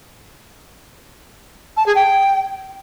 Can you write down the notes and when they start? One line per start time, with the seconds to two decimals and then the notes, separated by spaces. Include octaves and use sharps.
1.76 A5
1.86 G#4
1.95 G5